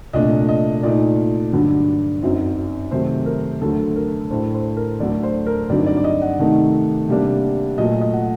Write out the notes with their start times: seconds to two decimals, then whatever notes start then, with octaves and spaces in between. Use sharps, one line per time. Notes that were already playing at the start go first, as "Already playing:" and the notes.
0.13 C2 A#2 A3 D4 D#5
0.49 D#5
0.83 A#2 A3 D#4 D5
1.53 G2 D3 F#3
2.22 F#2 F#3 C4 D#4
2.91 C3 D#3 F#3 A3 C5
3.26 A#4
3.61 D2 D3 F#3 A3 A4
3.96 A#4
4.30 A2 A3 D4 C5
4.54 C5
4.77 A#4
5.00 D2 D3 F#3 A3 D5
5.23 C5
5.46 A#4
5.69 G2 D3 F#3 C4 D#4 D5
5.87 D5
5.97 D5
6.04 D#5
6.22 F#5
6.39 C3 D#3 A3 D#4
7.09 C3 G3 A#3 D4
7.78 A#2 F#3 A3 D#5
8.01 D#5
8.13 F#5